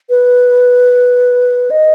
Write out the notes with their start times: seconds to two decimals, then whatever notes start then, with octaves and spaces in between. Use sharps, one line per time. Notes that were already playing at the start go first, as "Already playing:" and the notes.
0.10 B4
1.71 D#5